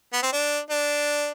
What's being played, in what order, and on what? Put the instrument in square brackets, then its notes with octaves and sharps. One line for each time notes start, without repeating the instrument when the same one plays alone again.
[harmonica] B3
C4
D4
D4